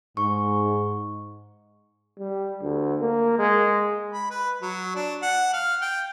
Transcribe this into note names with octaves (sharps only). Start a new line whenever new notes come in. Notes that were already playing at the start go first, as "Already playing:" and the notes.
G#2 C#6
G3
D2
A#3
G#3
B5
B4
F#3
D4
F#5
F5
G5